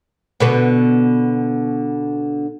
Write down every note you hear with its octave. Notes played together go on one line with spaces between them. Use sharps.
B2 D3 B3